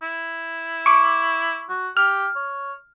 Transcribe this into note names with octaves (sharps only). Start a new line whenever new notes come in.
E4
C#6 D6
F#4
G4 F6
C#5